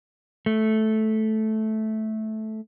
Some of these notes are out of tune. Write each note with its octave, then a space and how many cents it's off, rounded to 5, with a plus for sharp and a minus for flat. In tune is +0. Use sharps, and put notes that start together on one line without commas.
A3 -10